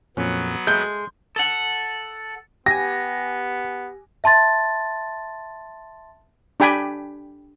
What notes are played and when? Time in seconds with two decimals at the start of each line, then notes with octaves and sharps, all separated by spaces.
0.17 F2 A#2 F#3 B3 C#4
0.67 G#3 A4 G6
1.36 A4 F#5
2.66 B3 G4 G#5 A#6
4.24 E5 A5 C6 A6
6.60 D4 G4 G5 G#5 B5